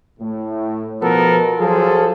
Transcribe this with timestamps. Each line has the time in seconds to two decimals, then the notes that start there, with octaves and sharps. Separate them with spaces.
0.20 A2
1.01 B2 F3 B3 A4 A#4
1.59 F3 F#3 F4 G#4 A4